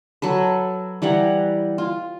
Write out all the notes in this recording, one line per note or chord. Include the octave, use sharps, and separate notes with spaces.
F#3 A4 B4
E3 G3 F#5 A#5
F4